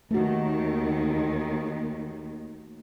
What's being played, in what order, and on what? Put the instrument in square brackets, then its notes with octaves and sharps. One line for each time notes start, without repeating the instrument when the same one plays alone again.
[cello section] D#2 D#3 [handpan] A3 F#4